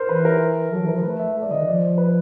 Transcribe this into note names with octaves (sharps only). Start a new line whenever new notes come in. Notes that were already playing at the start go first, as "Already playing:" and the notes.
Already playing: A#4 C5
E3 B4
A#4
F#3 A4
E3 A#4
F3
A3 B4
E5
A3
G#3 D5
D3 D#5
D#3
F3 D5
B4